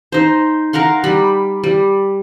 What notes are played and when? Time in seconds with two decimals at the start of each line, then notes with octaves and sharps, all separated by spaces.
0.12 D#4 C5
0.73 A#4 F5 F#5 C6
1.04 G3 B5
1.64 G3